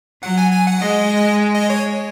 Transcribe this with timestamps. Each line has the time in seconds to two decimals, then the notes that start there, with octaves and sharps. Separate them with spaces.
0.22 F#3 F#5
0.38 G#5
0.51 G#5
0.67 F#5
0.81 G#3 D#5
1.54 D#5
1.70 C#5